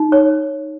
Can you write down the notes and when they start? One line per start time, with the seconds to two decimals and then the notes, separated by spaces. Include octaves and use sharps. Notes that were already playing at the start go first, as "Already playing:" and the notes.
Already playing: D#4
0.12 C#5